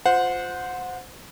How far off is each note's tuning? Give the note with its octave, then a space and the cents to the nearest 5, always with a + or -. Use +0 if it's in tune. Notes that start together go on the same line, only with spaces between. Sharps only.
F4 +10 C5 -15 F#5 -25